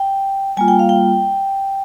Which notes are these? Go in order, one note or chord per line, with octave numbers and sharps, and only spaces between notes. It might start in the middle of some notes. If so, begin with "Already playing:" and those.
Already playing: G5
G3 A#3 F4 G#5
G5
F5
G5